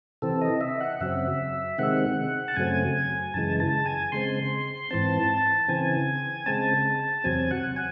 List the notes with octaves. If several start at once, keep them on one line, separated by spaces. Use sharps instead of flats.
C3 E3 C4 A4
D#5
E5
F#5
F#2 C#3 F#3 C4 E5
C3 D#3 G#3 C4 F#5
A5
F#2 C#3 F#3 A3 C4 G#5
F#2 C#3 E3 G#3 A5
A5
G#5
C#3 G#3 C4 C6
G#2 E3 C4 A5
C#3 E3 C4 G#5
C#3 G#3 C4 A5
E2 C3 F#3 C4 G#5
F#5
G#5